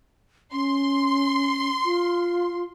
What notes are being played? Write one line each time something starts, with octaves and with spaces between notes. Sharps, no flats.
C#4 C6
F4